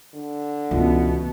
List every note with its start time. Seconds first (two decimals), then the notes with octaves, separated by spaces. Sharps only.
0.14 D3
0.71 C#2 B2 E3 B3